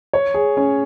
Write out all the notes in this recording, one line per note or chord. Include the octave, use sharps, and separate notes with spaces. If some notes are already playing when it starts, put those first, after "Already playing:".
C#5
G#4
C#4